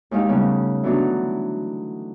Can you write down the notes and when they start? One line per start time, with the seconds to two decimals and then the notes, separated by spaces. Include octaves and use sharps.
0.11 D#2 G#3 D#4 G4 F5
0.29 C#3 G3 A3 B3 C#4
0.83 D3 E3 F#3 B3 D4 D#4